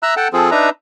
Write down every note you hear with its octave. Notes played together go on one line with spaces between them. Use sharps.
E5 A#5 E6 F#6
A4 F#5 G5 A5
F3 C4 F4 G#4 A4
D4 D#4 B4 E5 A#5